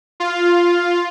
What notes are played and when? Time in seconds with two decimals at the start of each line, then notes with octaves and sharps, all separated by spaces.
0.20 F4